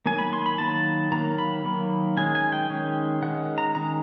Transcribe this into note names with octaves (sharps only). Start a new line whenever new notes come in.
D#3 F#3 A#3 G#5
B5
C6
B5
D#3 F#3 A#3 A5
D#3 F#3 A#3 A#5
B5
D#3 F#3 A#3
D#3 G#3 C#4 G#5
G#5
G5
D#3 G#3 C#4
D#3 G#3 C#4 F#5
A#5
D#3 G#3 C#4 A#5